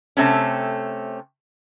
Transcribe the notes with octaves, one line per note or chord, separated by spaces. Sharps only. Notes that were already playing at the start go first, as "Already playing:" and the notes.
C3 A3 C4 C#4